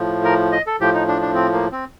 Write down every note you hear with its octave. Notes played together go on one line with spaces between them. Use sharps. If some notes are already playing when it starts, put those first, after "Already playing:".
Already playing: A2 F3
A#4
D#5
A4
A2 F3 G4
D#4
D4
D4
C4
A#3
C4